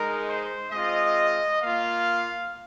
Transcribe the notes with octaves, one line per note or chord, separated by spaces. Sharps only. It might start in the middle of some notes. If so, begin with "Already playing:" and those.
Already playing: G#3 D#4 A#4
C5
G#3 C4 F4 D#5
A#3 F4 F5